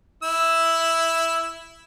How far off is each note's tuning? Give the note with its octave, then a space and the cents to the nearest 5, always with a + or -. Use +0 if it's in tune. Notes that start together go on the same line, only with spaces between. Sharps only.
E4 +0 E6 +0